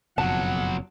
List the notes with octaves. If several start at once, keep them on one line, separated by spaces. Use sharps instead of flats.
F#1 F2 B2 F#3 F#5 A5